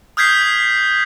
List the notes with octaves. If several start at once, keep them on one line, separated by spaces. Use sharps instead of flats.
D#6 F6 G6 G#6 B6 C7